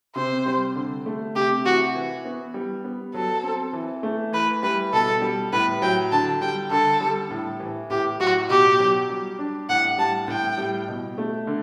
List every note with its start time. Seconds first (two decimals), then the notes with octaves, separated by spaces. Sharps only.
0.16 C3 C5
0.46 G3
0.75 D3
1.06 A3
1.35 C3 G4
1.65 E3 F#4
1.95 E3
2.25 B3
2.54 G3
2.84 B3
3.14 F#3 A4
3.43 C4
3.73 E3
4.03 A3
4.32 E3 B4
4.63 G3 B4
4.93 B2 A4
5.22 G3
5.52 A2 B4
5.82 F#3 G5
6.12 D3 A5
6.41 G3 G5
6.71 D3 A4
7.01 G3
7.30 A2
7.60 E3
7.90 A2 G4
8.19 F#3 F#4
8.49 B2 G4
8.79 F#3
9.10 G3
9.39 D4
9.69 A2 F#5
9.98 G3 A5
10.28 A2 G5
10.58 G3
10.88 B2
11.18 A3
11.47 D3